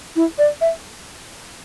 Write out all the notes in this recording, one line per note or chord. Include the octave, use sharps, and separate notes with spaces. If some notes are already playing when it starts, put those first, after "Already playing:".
E4
D5
E5